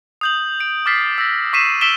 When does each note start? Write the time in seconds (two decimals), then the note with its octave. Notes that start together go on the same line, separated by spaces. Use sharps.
0.21 D#6 G6 F#7
0.60 D7
0.86 D6 F6 A6 B6 C7
1.18 E6 A#6
1.53 C#6 D6 B6 C7 D#7 E7
1.81 E6 B6 D7 E7 G7